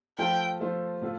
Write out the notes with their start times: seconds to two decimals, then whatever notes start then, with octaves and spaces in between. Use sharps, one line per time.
0.18 F3 A3 F4 A4 C5 G5
0.60 F3 A3 F4 A4 C5
1.02 A2 A3 F4 A4